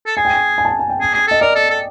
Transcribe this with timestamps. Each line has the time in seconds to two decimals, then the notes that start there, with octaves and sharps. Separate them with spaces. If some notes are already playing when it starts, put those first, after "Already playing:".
0.06 A4
0.17 G#4 G#5
0.25 G5
0.34 G#5
0.58 G#5
0.65 A5
0.68 G#5
0.79 G#5
0.90 G5
1.01 G#4
1.14 G#4
1.28 A4 D#5
1.41 A#4 D5
1.56 A4
1.70 A4